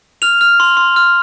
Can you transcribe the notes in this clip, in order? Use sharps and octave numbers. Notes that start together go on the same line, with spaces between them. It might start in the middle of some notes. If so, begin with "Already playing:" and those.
F6 F7
F6
C6
C6
F6